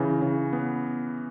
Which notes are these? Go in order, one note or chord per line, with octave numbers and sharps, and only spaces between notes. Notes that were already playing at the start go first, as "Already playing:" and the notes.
Already playing: C#3 E3
C#3
B3